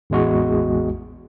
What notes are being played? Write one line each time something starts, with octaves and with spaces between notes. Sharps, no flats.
A1 E2 G#3 F#4